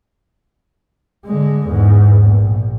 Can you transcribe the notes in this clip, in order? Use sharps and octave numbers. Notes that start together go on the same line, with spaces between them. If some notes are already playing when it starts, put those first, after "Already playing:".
D3 G#3
E2 G#2
A#1